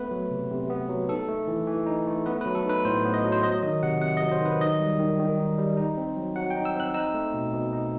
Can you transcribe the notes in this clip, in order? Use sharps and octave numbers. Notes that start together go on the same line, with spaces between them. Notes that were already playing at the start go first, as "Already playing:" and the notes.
Already playing: A3 B3 B4
F#3
C3
C3
B3
F#3
D#4 A4
A3
E3
E3
D#4
A3
B3 B4
B4
F#3
A4
D#4 B4
A2 C5
B3
D#5
F#3
C5
F#3 D#5
D#3 D#5
C3 F#5
C3 F#5
D#5
F#3
C5
D#3 B4
D#4 D#5
G3
D#3
D#3
D#4
G3
D#4
C4
F#3
F#3 F#5
G5
D#4
E6
C4 F#6
D#4 E6
A3
B2
B2
D#4